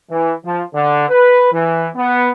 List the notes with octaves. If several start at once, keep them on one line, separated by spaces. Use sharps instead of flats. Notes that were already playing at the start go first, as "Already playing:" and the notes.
E3
F3
D3
B4
E3
B3